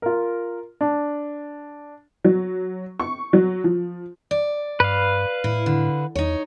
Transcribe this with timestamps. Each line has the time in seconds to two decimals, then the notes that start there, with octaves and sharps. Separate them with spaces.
0.02 F4 A#4
0.81 D4
2.24 F#3
3.00 C#6
3.33 F#3
3.64 F3
4.31 D5
4.80 G2 B4 F5
5.44 A2 E4
5.66 D3
6.15 E2 D#4 C#5